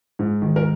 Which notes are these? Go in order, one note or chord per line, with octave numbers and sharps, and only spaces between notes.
G#2
D#3
A#4